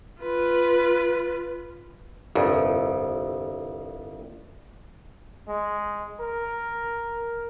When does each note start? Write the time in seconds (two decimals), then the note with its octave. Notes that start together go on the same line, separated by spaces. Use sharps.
0.22 F4 B4
2.35 G1 C2 F2
5.48 G#3
6.20 A#4